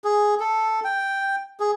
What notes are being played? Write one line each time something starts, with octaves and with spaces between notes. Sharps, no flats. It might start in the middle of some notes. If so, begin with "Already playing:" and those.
G#4
A4
G5
G#4